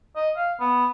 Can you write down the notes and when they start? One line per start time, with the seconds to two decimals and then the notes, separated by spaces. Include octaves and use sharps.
0.16 D#5
0.37 F5
0.60 B3